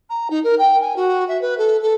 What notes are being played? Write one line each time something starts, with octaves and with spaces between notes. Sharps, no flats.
A#5
D#4
A#4
G5
G#5
F#4
E5
B4
A4
A4